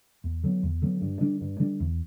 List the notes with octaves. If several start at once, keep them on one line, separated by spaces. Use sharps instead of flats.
E2
D3 F#3 B3
E2
D3 F#3 B3
G2
D3 G3 D4
G2
D3 G3 D4
E2